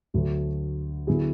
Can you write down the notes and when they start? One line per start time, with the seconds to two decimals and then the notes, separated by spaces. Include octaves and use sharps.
0.14 D2 D3 F#3 A3
1.07 D3 F#3 B3 E4 G#4